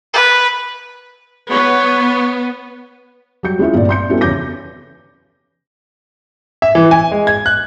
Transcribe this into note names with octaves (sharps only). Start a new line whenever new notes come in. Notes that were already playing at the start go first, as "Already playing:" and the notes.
B4
B3 C#5
F#3 G3 G6 C#7
G#3 C#4 E4 F4
G1 A#2 D5
C6 G6 C#7
G3 B3 C#4 E4 F#4 A4
E2 C#3 C#5 D6 G6 A#6
E5
E3
G#5
G#3
G#6
F#6